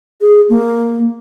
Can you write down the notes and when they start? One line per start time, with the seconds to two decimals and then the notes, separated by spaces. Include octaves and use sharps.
0.21 G#4
0.49 A#3